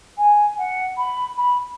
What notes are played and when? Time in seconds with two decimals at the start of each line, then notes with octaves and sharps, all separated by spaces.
0.18 G#5
0.58 F#5
0.97 B5
1.37 B5